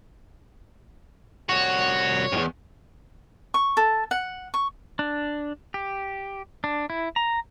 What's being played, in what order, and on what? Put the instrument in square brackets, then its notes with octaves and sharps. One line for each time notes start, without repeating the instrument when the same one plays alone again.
[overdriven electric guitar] C2 F#4 [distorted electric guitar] C#5
[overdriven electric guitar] E2 G2
[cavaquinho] C#6
A4
F#5
C#6
[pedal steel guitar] D4
G4
D4
E4
A#5